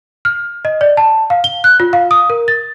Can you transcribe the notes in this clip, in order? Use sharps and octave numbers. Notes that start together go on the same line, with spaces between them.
F6
D#5
D5
A5
F5
G7
F#6
F4
F5
D#6
A#4
A6